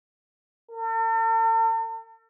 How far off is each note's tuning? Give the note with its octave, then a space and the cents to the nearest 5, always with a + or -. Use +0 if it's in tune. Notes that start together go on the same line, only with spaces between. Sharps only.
A4 +45